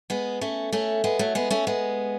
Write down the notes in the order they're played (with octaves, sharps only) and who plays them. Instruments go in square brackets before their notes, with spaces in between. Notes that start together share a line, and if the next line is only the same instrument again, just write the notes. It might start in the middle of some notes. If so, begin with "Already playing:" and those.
[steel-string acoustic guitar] G#3 B3
A3 C#4
A3 C#4
G#3 B3
F#3 A3
G#3 B3
A3 C#4
G#3 B3